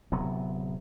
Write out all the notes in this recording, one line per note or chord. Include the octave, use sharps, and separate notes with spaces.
D1 C3 F#3 B3